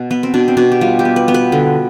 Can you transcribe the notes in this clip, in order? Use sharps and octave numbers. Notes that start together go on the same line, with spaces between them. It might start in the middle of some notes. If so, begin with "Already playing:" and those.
Already playing: B2
B3 B4
C4
B2 D4
C4
B2 D4
G4
G3 F4
G4
B3
B4
B3
B4
D3